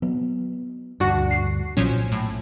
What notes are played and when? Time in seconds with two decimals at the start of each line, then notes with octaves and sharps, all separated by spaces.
0.02 F#3 B3
1.00 D2 G2 D4 F#4
1.31 C7
1.77 B1 A#2 F3 F#3 C#4
2.12 A2